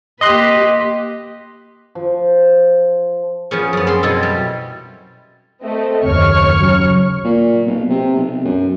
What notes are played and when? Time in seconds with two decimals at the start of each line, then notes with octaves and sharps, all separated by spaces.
0.21 A#3 G4 B4 D#5 C6 F#6
1.95 F3
3.51 F3 B3 C#4 G#4
3.73 F#2 B3
3.87 C4 C6
4.03 B2 E4 A4 D#5
4.23 G3
5.63 A3 C4 D#5
6.04 F#1 D#2 C#5 C#6 F6
6.56 C#3 F#3
7.24 A#2
7.67 B1
7.90 C3
8.16 B1
8.44 F#2